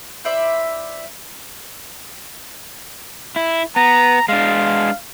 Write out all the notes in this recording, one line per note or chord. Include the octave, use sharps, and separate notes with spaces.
E4 C5 D5 E5
E4
B3 A#5
G#3 D4 F5